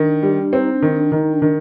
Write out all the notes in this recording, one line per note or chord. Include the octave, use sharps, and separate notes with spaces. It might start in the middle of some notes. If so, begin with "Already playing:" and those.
Already playing: D#3 D4
G3
C4 D#4
D4
D#3
D4
D#3 D#4
D4
D#3